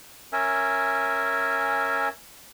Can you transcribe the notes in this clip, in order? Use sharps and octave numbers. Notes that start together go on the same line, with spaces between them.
C#4 A#4 E5 G#5